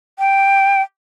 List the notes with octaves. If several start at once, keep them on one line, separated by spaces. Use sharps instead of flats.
G5